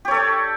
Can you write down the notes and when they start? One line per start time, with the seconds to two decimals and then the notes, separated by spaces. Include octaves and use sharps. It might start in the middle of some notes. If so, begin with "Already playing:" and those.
0.05 G4
0.08 C#5
0.11 A4
0.14 D5